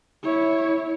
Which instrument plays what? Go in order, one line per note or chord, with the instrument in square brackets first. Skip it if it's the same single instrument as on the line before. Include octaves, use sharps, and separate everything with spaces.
[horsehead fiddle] E4 C#5